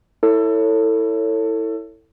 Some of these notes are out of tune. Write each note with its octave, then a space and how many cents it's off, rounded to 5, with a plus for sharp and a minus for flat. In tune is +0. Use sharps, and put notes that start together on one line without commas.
E4 -10 A4 +25 C#5 +0